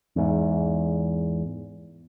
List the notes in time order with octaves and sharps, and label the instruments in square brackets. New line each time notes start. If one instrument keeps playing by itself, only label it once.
[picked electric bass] E2 G#2